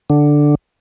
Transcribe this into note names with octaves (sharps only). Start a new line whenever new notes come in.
D3